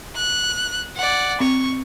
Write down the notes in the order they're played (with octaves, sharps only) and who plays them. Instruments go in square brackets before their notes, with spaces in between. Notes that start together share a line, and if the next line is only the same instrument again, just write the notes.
[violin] F#6
D5 F#5
[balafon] C4 [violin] C#6